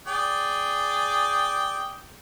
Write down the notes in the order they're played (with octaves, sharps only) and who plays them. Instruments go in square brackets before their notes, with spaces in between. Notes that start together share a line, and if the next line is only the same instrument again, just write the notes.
[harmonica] G#4 D5 G5